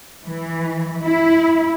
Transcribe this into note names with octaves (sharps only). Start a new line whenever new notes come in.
E3
E4